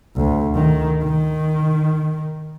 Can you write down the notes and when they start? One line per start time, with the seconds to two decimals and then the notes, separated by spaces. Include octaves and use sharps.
0.16 D2
0.55 D#3
1.03 D#3